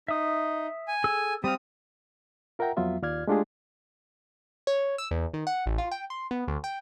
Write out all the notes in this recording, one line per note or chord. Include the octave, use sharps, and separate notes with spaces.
D#4 E5 D#6
G#5
G#4 A4 E6
G3 C4 F5 D#6
F4 A#4 E5 F#5 G5 A#5
F2 F#3 B3 F4 E5
D#2 F4 D5 F6 G#6
G#3 A3 D4 F4 G4 G#4
C#5
E6
E2
D#3
F#5
A1
F4
G5
C6
B3
D2
G5